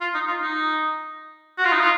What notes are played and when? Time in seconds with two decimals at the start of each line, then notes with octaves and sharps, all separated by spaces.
0.01 F4
0.14 D#4
0.27 F4
0.41 D#4
1.58 F#4
1.65 F4
1.72 D#4
1.80 F4